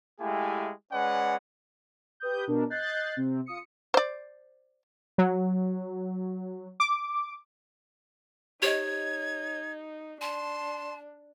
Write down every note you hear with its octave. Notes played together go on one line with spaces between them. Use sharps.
G#3 A3 E4 G4 F5 G#5
G#3 C#4 B4 D5 F#5
G4 B4 D#6 G6
B2 D4 A#4
D#5 F#6 G6 A6 C7
C3 C4
F4 D#6 C#7
C5 D5
F#3
D6
D#4 G4 C5 C#5 D#5 G#6
D4 A5 C6